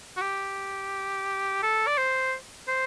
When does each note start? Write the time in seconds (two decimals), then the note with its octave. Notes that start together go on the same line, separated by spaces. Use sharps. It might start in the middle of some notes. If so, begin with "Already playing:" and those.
0.17 F#4
0.21 G4
1.63 A4
1.87 D5
1.98 C5
2.68 C5